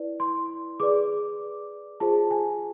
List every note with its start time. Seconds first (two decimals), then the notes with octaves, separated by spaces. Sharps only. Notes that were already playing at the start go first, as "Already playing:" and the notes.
Already playing: E4 B4 D5
0.20 C6
0.80 G#4 B4 D5 D6
2.00 F4 G#4 C5 A5
2.31 G#5